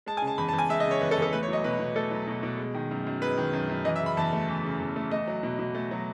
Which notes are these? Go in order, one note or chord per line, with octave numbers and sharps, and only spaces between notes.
G#3 A5
G#5
C#3
A5
E2 B5
A5
E2
G#5
G#3 E5
D#5
C#3
C#5
E2 B4
A4
E2
A4
A3 B4
C#5
F#3 D#5
B2 B4
B2
A3 A4
F#3
B2
B2
G#3
D#3
F#2
F#2
G#3 B4
D#3
F#2
F#2
E3 D#5
E5
C#3 B5
E2 A5
A3
E3
C#3
E2
A3
A3 D#5
F#3
B2
B2
A3
F#3